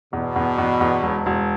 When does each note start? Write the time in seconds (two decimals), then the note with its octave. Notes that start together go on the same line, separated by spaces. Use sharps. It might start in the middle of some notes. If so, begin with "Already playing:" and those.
0.12 E2 B2
0.36 E2
0.58 E2
0.81 E2
1.03 E1
1.26 E1